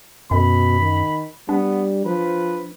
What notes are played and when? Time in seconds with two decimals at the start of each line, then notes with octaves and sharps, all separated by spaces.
0.31 F#2 B2 B5
0.81 D#3
1.49 G3 B3 D4
2.06 F3 B4